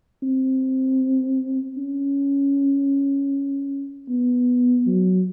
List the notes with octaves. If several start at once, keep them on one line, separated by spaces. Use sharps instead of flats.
C4
C#4
B3
F#3